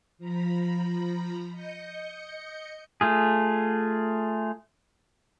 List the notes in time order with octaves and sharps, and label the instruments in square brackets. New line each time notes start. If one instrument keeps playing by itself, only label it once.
[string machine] F3 A#5 B5
D#5 G6 C#7
[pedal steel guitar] A3 F4 G#4